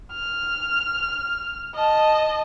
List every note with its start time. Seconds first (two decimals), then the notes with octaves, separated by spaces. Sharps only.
0.13 F6
1.75 D#5 A5